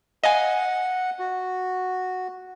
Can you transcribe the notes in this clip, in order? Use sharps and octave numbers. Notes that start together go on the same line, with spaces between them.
D#5 F5 F#5 G#5
F#4